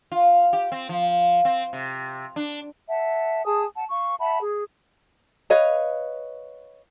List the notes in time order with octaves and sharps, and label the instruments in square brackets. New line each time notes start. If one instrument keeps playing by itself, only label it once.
[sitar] F4
G4
C4
F3
C4
C3
D4
[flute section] E5 F#5 A5
G#4 G#5 A5 D#6
F#5 A5
F5 C#6
E5 F#5 A5 B5
G#4
[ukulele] B4 C#5 D#5 F5